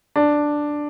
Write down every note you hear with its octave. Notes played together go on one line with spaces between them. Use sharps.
D4